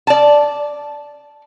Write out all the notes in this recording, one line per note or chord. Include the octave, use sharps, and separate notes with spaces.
D5 A5